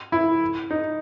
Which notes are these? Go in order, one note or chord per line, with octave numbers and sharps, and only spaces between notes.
E4
D#4